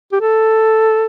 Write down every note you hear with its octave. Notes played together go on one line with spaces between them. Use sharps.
G4
A4